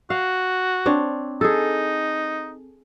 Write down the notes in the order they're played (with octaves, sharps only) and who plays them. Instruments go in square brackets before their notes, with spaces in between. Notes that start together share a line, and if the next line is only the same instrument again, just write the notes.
[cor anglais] F#4 [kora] F5
[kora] C4 D4 C#5
[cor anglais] D#4 [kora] G#4 A4